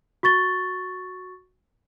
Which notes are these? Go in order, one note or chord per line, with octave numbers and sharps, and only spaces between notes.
F#4 C#6 A6 G7